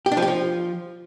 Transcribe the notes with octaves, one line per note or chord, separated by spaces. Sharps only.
G4
D4
F3
G4
F3